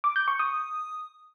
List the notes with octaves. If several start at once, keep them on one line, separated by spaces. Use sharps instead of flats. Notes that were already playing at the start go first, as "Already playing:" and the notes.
D6
G6
C#6
D#6